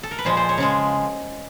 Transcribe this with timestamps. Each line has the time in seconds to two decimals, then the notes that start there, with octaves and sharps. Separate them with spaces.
0.03 A4
0.11 A#4
0.18 B4
0.25 A#2 F3 G#3 C5
0.37 C5
0.49 C#5
0.58 C#3 F3 G#3